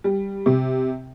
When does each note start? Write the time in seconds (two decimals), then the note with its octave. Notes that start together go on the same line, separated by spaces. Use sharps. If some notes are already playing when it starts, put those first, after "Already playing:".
0.04 G3
0.46 C3